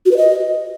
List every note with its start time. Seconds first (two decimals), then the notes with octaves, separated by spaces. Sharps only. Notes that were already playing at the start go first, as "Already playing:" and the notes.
0.06 F#4
0.11 B4
0.17 D#5